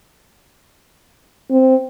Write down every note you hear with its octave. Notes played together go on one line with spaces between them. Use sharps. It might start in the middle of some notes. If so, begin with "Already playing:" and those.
C4